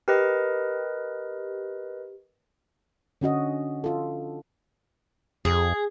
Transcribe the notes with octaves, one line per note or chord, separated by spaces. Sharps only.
G4 A#4 B4 D#5
D3 C#4 F#4 D#5
F4 A4
F2 G#4